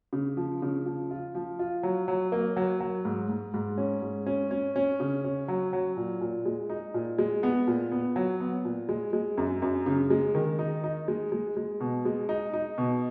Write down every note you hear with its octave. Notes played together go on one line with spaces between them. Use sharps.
C#3
F3
C#3
F3
F4
F3
F4
F#3
F#3
A#3
F#3
F#3
G#2
G#2
G#2
C#4
G#2
C#4
C#4
C#4
C#3
C#4
F#3
F#3
A#2
A#2
G#3
D#4
A#2
G#3
B3
A#2
B3
F#3
B3
A#2
G#3
G#3
F#2
F#2
C#3
G#3
D#3
D#4
D#4
G#3
G#3
G#3
B2
G#3
D#4
D#4
B2